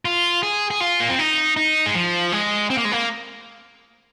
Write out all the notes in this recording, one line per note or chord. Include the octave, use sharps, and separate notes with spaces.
F4
G#4
G#4
F4
A#3
C4
D#4
D#4
G#3
F3
G#3
C4
A#3
G#3
A#3